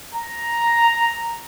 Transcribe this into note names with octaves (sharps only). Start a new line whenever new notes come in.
A#5